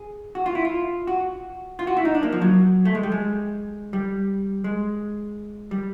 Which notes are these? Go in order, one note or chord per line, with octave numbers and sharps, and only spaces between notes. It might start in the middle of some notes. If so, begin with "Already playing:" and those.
Already playing: G#4
F#4
F4
E4
F4
F#4
F4
F#4
E4
D#4
D4
A#3
F3
F#3
A3
G#3
G3
G#3
G3
G#3
G3